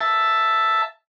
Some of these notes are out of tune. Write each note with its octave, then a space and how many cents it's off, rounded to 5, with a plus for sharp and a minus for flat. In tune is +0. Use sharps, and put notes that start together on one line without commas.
E5 +5 A5 +0